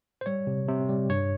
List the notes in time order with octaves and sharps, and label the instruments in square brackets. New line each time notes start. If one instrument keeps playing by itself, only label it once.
[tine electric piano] C5
G3 C#5
C3
C3
G3
G2 C#5